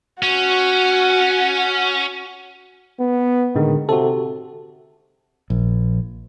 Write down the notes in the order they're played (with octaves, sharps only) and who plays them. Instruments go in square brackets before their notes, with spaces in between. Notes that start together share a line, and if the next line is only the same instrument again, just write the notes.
[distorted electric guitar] C#4 [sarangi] F#4
[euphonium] B3
[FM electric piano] A2 D3 G#3 [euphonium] D#3
[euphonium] C3 [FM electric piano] F#4 A4
[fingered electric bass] A#1